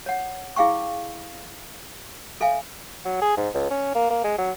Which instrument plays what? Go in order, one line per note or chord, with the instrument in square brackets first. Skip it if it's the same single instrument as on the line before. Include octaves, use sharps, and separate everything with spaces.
[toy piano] C#5 F#5
E4 G#4 F5 G5 C#6
A4 E5 F5 G#5
[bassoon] F#3
G#4
G#2
C#2
C#4
A#3
A#3
G#3
F#3